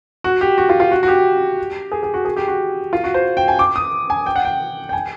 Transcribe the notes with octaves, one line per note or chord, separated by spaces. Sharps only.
F#4
G4
F#4
F4
F4
F#4
F#4
G4
G#4
G#4
F#4
G#4
G4
F#4
F4
F#4
C5
G5
G#5
D6
D#6
G#5
G5
F#5
G5
G5
G#5